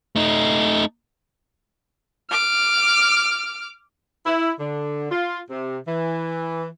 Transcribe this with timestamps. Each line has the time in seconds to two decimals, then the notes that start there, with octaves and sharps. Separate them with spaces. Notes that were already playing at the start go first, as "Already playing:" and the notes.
0.16 A3 D#4
2.30 D6 F6
4.26 E4
4.60 D3
5.11 F4
5.49 C3
5.87 E3